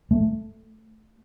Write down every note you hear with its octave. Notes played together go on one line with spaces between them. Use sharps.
A3